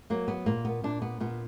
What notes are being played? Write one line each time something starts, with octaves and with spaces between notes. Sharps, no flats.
F#3 A#3
B3
A#2 A#3
B3
A#2 D4
B3
A#2 B3